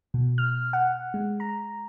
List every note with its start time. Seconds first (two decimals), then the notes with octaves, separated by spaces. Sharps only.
0.14 B2
0.38 F6
0.73 F#5
1.14 G#3
1.40 A#5